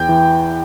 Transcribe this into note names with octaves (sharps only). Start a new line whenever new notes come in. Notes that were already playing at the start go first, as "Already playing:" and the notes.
Already playing: E2 G5
E3